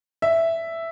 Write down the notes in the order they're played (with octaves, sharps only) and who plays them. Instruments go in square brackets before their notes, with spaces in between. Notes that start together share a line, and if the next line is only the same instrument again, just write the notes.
[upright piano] E5